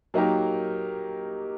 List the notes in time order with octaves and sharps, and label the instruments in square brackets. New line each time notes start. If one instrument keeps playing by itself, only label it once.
[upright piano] F#3 A#3 D#4 G4 A#4